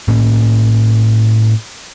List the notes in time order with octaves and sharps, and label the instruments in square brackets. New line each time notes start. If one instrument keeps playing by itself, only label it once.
[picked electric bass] A2 A#3 C#4